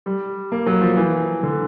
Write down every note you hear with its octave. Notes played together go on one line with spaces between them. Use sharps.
G3
A#3
F#3
F3
E3
D3